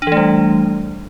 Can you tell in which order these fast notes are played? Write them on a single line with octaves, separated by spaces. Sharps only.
D4 E3 A3 G3